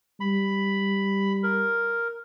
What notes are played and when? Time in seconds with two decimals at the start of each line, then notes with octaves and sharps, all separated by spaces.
0.21 G3 B5
1.43 A#4